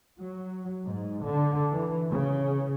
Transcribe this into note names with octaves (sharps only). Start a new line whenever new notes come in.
F#3
G#2
D3
E3
C#3